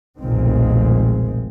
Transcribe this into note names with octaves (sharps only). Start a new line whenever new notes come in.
F1 B1 A#2 D#3 G#3 C4